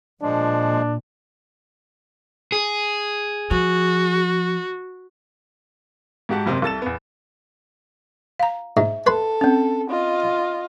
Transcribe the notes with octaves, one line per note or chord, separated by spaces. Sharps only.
A#2 F3 G#3 D4
G#4
F3 F#4
G#2 F#4 G4 F#5 A5
F#1 C3 C5
C2 A4 A6 E7
E2 B3
F5 A#5
G#2 E5
A4 B4 C6
C4 C#4
F4 D#5